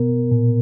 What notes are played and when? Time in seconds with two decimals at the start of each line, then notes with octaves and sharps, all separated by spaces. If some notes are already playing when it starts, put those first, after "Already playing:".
Already playing: B2 B3 A#4
0.31 A#2